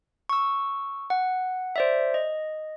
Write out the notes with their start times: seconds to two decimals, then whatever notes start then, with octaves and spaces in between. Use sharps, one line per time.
0.29 C#6 E6
1.10 F#5
1.76 C5 D5 E5
2.14 D#5